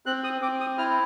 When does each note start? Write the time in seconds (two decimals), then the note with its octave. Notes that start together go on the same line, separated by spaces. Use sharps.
0.06 C4 F#6
0.24 D#6
0.42 C4 D6
0.60 D#6
0.78 E4 F6